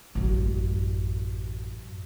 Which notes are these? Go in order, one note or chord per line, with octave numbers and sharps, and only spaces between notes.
A1 F#2